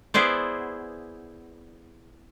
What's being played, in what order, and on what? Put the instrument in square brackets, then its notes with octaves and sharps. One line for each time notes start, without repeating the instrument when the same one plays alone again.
[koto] B3 E4 G#4 C5 D5